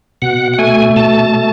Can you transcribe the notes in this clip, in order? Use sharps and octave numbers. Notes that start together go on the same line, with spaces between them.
B2 F#5
F#5
A3 G#5
B2 A5
A3